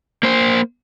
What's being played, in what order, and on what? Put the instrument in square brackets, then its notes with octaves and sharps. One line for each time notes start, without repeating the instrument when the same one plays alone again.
[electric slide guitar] A#3 C5